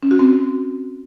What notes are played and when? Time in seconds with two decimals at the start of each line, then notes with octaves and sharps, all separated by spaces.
0.03 C#4
0.11 F#4
0.19 C4